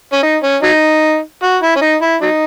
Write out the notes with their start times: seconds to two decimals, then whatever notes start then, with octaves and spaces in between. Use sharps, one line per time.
0.13 C#4
0.23 D#4
0.43 C#4
0.63 F#3 D#4
1.43 F#4
1.63 E4
1.76 C#4
1.82 D#4
2.02 E4
2.22 F#3 D#4